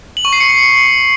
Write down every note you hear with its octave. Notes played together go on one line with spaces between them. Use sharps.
F#7
C#6
C7
C#7